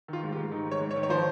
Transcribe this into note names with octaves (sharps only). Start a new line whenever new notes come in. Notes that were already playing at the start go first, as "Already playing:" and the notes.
D#3 F4
G#2
G4
G#2
D#3 D#4
G#2
C#5
G#2
C#5
D#3
C#5
F3 C5